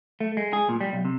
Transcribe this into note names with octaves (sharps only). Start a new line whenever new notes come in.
A3
G#3
G#4
A#2
G3
B1
C3